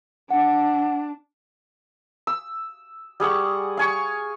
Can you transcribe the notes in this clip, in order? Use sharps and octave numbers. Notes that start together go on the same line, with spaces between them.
D4 F#5
E6
G3 G#4 F#5 C#6
F5 G#5 C#6